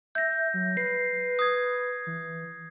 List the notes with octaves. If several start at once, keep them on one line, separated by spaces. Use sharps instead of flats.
E5 G6 A#6
F#3
B4 C7
D#6 G#6
E3